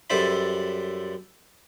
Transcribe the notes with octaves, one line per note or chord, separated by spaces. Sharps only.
F#2 G3 A4 C5 E5 B5